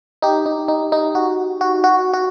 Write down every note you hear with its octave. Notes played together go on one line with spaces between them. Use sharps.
D#4 G4
D#4
D#4
D#4
F#4
F#4
F#4
F#4